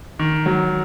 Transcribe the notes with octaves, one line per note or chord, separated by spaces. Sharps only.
D#3
F#3